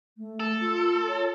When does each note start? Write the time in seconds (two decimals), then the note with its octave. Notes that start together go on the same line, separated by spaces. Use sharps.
0.18 A3
0.40 A4
0.61 F4
1.09 C#5